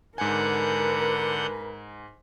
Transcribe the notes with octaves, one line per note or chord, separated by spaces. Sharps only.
G#2 D3 A#4 B4 F#5 G#5 G6